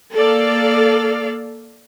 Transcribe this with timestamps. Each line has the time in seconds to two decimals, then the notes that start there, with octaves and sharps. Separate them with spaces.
0.13 A#3 A4 D5 F5